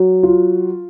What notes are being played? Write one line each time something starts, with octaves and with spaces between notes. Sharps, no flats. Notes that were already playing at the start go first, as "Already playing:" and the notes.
Already playing: F#3
F4